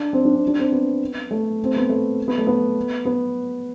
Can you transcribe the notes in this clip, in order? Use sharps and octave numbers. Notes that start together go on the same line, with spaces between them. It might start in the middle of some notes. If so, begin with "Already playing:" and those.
Already playing: D4
C4
D4
C4
D4
C4
B3
A3
C4
B3
A3
B3
A3
B3
B3